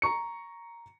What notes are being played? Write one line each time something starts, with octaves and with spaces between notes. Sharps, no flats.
A#5 C#6 C#7